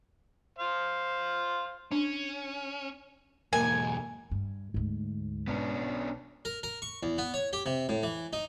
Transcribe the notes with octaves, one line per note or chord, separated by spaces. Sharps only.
C5 F5
C#4 D4
B1 E2 A#3 A#4 G#5
G2
D2 G#2 A3
B1 B3 C#4 D4
A#4
A#4
C#6
E2
B3
C#5
G4
C3
A2
E3
D#4